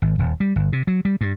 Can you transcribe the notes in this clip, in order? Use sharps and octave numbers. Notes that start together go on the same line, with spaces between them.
G#1
D#1
G3
G1
C3
F#3
G3
G2